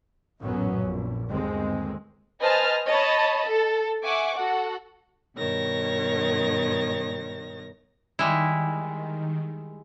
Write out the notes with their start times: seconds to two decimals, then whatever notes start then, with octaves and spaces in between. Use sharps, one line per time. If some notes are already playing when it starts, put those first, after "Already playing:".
0.41 A1 F#2 A#2 F#3 B3 C#4
0.82 A#1
1.29 G1 D#2 G#3 C4
2.41 B4 C5 D#5 G#5 A5 F6
2.87 C#5 D#5 A5 B5
3.47 A4
4.04 E5 F#5 G#5 C#6 D6
4.36 F#4 A4 F#5
5.36 G2 B2 D#3 C#5 A#6
8.19 D#3 G3 G#3 E4